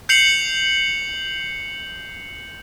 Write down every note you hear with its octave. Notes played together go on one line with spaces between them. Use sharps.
G6 C7 C#7 F7 F#7